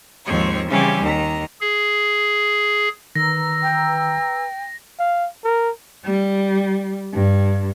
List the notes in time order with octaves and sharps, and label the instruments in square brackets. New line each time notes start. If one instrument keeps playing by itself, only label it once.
[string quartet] D#2 G#2 F3 C4 C#5 C#6
C#3 E3 G3 C4 C#4 G4
D#2 D#3 A#5
[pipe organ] G#4
[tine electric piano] D#3 [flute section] B4 A#5 E6 [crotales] A#6
[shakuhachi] G5
[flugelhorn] F5
A#4
[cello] G3
G2